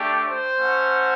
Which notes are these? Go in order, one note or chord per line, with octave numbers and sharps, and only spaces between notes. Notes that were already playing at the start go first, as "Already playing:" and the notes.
Already playing: A3 D4 G4
C5
A3 C#4 F#4